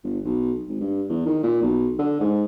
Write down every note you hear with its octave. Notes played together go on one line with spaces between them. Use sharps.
G1
B1
G#1
G2
E2
D#3
A#2
B1
D3
G#2